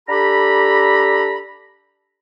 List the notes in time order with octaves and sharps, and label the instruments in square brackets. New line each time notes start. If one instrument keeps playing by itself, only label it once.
[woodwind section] D4 G4 A4 A#5 B5